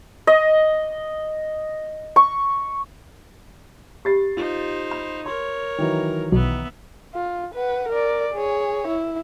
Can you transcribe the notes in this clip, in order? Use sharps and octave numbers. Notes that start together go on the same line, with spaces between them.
D#5
C#6
G4 B5 A6 C7
D#4 F4 C5
B5
A#4 C#5 C6
D#3 E3 F#3
B1 B2 B3 E5
F4
B4 F#5
A#4 D5
G#4 C#5
E4